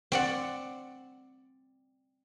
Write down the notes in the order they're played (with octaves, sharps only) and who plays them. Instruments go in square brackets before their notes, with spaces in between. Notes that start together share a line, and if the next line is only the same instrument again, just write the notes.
[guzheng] C4 D5 F#5